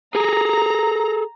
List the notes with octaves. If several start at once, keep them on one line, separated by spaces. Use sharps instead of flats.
G#4 A4 A#5